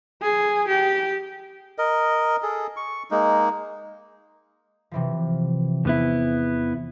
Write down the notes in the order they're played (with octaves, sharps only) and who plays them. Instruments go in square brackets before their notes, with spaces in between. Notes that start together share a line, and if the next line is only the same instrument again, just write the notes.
[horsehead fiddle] G#4
G4
[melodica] A#4 D#5
G#4 A4
C#6
G#3 A#3 D#4
[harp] C3 E3 F3
[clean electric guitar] E2 B3 E4